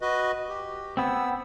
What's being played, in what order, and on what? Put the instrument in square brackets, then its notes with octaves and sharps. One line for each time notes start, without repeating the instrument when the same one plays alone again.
[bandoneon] F#4 B4 D#5
G4
[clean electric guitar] B3 C4 [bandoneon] E6